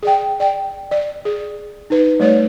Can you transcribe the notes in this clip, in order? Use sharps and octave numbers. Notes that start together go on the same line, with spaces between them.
G#4 D5 G5
D5 G5
D5
G#4
D#4 B4
G3 A3 C#5 D5